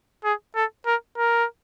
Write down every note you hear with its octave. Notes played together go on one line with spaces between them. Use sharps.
G#4
A4
A#4
A#4